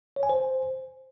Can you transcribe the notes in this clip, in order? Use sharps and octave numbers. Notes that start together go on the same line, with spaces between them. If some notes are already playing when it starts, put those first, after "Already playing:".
C#5
G#5
C5